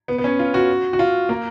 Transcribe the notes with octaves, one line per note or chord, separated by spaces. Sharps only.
B3
B3
C#4
F4
F#4
F#4
F4
A#3